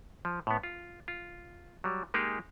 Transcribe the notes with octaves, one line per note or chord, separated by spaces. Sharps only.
F3
A2 B3
F4
F4
F#3 G3
G#3 A#3 D#4 G4 G#4